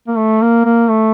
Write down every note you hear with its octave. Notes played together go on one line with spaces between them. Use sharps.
A#3
A3
A#3
A#3
A3